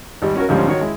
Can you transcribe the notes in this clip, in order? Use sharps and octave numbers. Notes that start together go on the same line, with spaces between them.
G#1 G3
C#4 F#4 A#4
D2 G#2 F3 G3 C#4
D#3 F#4 C#5
G#3 E4